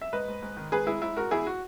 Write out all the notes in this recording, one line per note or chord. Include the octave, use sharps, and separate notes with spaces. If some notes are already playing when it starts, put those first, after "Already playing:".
E5
G#2 B4 D#5
G#2
G#2
D#3
G#2 G#4 B4
G#3 E4 G#4
G#2 E4
G#3 F#4 A#4
E2 E4 G#4
F#4